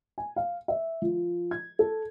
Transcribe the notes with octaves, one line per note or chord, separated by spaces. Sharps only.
G#5
F5
E5
F3
G#6
A4